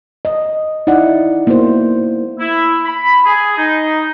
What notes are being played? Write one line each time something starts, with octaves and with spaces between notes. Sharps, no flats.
D#5
D#4 E4 D5 F#5
A#3 B3 E4 F#4 C5
E4
B5
G#4
D#4